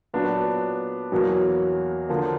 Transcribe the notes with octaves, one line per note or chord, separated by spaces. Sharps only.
A#2 F#3 B3 D4
E2 B2 F#3 A#3
D3 F3 A#3